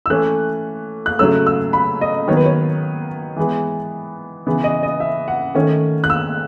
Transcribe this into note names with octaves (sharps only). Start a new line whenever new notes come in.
E6
E3 A3 C#4 F#6
F#6
C#3 F#3 A3 C#4 E6
E6
B5
D#5
D#3 F#3 B3 C#5
B4
C#5
E3 G#3 B3
C#3 E3 B3
D#5
D#5
E5
F#5
D#3 A3 C#4
F#6
E6